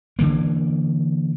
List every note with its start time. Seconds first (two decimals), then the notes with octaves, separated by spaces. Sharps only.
0.19 D3 E3 A#3